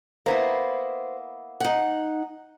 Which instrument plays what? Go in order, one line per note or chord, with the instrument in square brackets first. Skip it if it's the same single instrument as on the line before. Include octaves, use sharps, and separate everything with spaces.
[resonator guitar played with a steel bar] A#3 B3 E4 [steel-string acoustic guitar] C5
[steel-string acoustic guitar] D#4 F#5